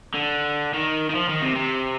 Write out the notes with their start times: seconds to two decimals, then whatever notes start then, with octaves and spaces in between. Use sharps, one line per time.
0.14 D3
0.74 D#3
1.10 D#3
1.15 F3
1.29 D#3
1.42 C3
1.55 C3